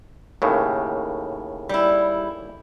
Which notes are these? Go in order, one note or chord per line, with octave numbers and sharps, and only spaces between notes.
D#2 A2 C#3
G3 E4